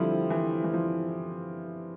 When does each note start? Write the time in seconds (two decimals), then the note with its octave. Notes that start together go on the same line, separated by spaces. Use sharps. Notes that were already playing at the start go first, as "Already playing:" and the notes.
Already playing: D3 F3 G3 C4 E4
0.30 E3
0.64 E3
0.73 F3